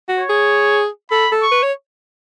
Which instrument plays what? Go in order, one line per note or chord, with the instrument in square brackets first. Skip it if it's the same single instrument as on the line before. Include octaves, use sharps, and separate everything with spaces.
[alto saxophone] F#4
[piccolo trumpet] C#5
[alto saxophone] G#4
[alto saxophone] A4 [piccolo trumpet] B5
[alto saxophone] A4
[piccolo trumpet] C#6
[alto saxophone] B4
C#5